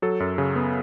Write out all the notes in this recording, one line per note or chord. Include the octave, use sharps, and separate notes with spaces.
F#3 A4
F#2
C#3
B3